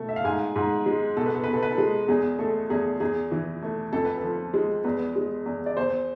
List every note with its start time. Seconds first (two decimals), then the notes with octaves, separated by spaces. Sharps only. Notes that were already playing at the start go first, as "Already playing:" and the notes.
Already playing: B2 A3
0.09 E5
0.16 F5
0.24 G#2 G#5
0.56 G#2
0.86 G#3
1.16 B2 A4
1.26 B4
1.35 A4
1.44 B2 B4
1.53 A4
1.63 B4
1.71 A4
1.78 G#3
2.08 E2 G#4
2.39 A3 A4
2.70 E2 G#4
3.00 E2 G#4
3.31 E3
3.62 A3
3.93 F2 A4
4.05 B4
4.17 A4
4.24 F3
4.54 G#3
4.84 E2 B4
5.16 G#3
5.46 E2
5.66 D5
5.77 E2 C5